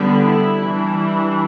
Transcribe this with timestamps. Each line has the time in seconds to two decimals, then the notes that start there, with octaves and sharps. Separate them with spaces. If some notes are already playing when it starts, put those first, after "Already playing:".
Already playing: D3 G3 B3
0.21 E4
0.57 E3 G3 D4